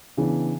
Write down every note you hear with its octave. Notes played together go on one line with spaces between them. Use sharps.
C#3 E3 B3 D4